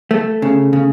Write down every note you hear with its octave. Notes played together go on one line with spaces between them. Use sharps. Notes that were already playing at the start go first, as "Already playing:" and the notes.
A3
C#3
C#3